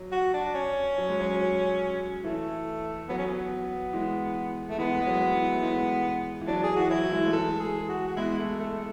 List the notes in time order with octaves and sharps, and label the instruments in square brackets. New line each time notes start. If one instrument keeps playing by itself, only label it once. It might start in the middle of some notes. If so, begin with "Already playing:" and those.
Already playing: [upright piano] F#3
[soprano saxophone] F#4
D4
C#4
[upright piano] F#3
G#3
F#3
F#3
[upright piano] E3 [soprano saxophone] A3
[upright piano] F#3 [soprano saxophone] B3
[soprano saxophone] C#4
B3
[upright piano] E3 G#3
[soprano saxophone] A3
[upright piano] E3 G#3 [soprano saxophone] B3
[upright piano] G#3
F#3
E3
A3
E3 G#3
E3
[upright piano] F#3 [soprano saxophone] D4
[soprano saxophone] G#4
[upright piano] E3 [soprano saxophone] F#4
[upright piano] F#3 [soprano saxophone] E4
[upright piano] E3 G#3
A3
[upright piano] E3 G#3 [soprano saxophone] A4
[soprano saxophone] G#4
F#4
F#4
[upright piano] G#3 B3 [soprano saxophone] E4
[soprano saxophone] A3
A3